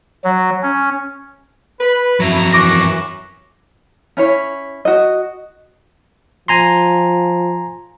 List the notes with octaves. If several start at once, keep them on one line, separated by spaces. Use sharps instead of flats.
F#3
C#4
B4
F2 F#3 E4 A#5
F#2 E3 C#6 D6 A#6
C#4 E4 C#5
F#4 D#5
F3 G#5 A#5 C6